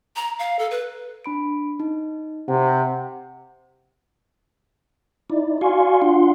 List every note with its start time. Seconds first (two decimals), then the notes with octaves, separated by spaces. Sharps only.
0.16 A#5
0.39 F5
0.59 A4
0.71 B4
1.24 D4 B5 D7
1.80 D#4
2.48 C3 F#5
5.30 D#4 E4 D5
5.61 F#4 D5 F5 G#5 C6 C#6
6.02 D4 F4 F#5 C6